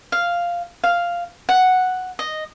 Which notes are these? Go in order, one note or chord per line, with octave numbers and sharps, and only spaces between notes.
F5
F5
F#5
D#5